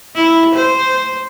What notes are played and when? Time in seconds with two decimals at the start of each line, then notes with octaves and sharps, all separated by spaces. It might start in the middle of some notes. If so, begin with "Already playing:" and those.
0.15 E4
0.55 C5